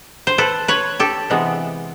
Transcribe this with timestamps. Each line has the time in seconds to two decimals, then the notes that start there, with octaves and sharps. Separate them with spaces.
0.27 C5
0.38 A4 B4
0.68 B4 C#5
1.00 G4 A4
1.30 C3 E3 G#3 B3